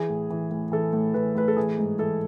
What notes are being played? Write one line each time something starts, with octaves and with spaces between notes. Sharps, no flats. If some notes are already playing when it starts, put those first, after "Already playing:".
Already playing: E3 G#4
A2
E3
A2
E3 A4
A2
E3 B4
A2 B4
A4
E3 G#4
G#2
E3 A4